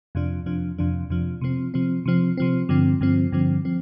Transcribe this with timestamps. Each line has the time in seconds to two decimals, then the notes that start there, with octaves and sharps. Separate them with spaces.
0.15 F2 C3 F3 D4
0.46 F2 C3 F3 D4
0.78 F2 C3 F3 D4
1.10 F2 C3 F3 D4
1.41 C3 F3 C4
1.74 C3 F3 C4
2.06 C3 F3 C4
2.37 C3 F3 C4
2.69 G2 D3 F3 C4
3.01 G2 D3 F3 C4
3.32 G2 D3 F3 C4
3.65 F3 C4